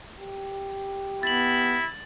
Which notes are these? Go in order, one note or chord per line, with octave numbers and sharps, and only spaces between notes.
G4
B3 E4 A6 F#7